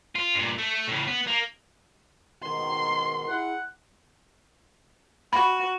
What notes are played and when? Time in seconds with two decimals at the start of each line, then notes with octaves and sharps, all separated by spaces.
0.15 F4
0.34 G2 A#2
0.58 A3
0.88 A2 C#3
1.07 B3
1.27 A#3
2.43 G#2 B2 D#3 C6
3.29 E4 G#4 F#5
5.33 F#4 B5